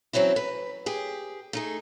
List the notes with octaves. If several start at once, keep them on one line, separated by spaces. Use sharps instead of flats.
E3 F#3 C4 C#4 E4
B4
G4 G#4
A3 D#4 G#4